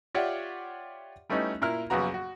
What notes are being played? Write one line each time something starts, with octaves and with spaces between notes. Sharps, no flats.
F4 G4 C#5 D5 E5 F#5
G3 A3 B3 C#4 D#4 E4
A#2 E4 A#4 F6
A#1 F#2 C#3 B3 F#4 A#5
F#4